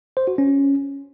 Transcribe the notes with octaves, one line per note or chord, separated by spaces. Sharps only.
C5
F#4
C#4